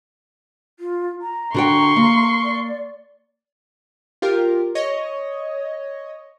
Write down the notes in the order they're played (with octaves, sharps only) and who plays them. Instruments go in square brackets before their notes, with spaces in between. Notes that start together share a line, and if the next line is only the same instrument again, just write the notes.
[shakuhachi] F4
A#5
[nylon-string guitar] D3 F#4 G5 [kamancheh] C6 C#6
[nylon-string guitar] A#3
[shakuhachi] D5
[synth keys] F4 G4 A#4
C#5 D#5